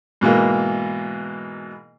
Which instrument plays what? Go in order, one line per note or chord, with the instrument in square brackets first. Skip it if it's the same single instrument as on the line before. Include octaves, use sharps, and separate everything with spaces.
[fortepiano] G#2 B2 E3 A#3